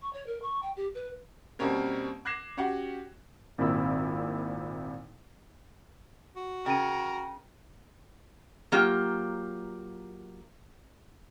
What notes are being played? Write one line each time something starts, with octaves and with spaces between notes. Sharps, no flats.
C#6
C#5
A#4
C#6
G5
G4
B4
B2 G3 A#3 C4 C#4 A#4
D6 F#6 G#6 A#6 C7 E7
C#4 F#4 G4 F#5
G#1 A#2 C4 E4 A#4 E6
F#4
C#3 A#4 G5 D#7
F#3 A#3 F4 G4